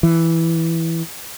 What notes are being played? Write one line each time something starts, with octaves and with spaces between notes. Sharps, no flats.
E3